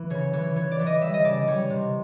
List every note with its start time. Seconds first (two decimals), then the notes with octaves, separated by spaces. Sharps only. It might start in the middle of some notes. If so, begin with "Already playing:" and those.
Already playing: E3
0.10 C#3 C#5
0.33 E3 C#5
0.56 E3 C#5
0.71 D5
0.79 E3
0.86 D#5
1.01 G3 E5
1.14 D#5
1.24 C#3 D5
1.47 G3 C#5
1.70 C3